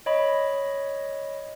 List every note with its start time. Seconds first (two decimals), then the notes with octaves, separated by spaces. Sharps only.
0.06 C#5 D#5 B5